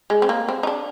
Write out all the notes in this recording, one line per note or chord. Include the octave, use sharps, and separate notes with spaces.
G#3
C4
A#3
C4
D#4
D4